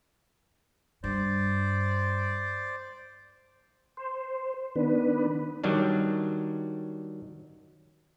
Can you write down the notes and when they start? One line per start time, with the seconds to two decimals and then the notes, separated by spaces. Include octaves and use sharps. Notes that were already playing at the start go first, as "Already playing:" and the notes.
1.04 G2 C5 D5
3.97 C5
4.76 D#3 B3 D4 B4
5.64 D#3 F#3 G3 D4